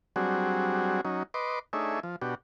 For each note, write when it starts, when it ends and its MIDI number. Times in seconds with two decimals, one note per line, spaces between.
0.16 1.01 54
0.16 1.01 55
0.16 1.01 60
0.16 1.01 62
0.16 1.01 66
0.16 1.01 68
1.05 1.23 54
1.05 1.23 61
1.05 1.23 63
1.34 1.59 71
1.34 1.59 75
1.34 1.59 84
1.34 1.59 86
1.73 2.00 57
1.73 2.00 62
1.73 2.00 63
1.73 2.00 68
1.73 2.00 73
1.73 2.00 76
2.03 2.16 53
2.22 2.35 47
2.22 2.35 62
2.22 2.35 66
2.22 2.35 67